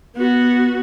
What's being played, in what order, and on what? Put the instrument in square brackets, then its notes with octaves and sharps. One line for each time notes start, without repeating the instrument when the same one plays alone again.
[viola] B3 F#4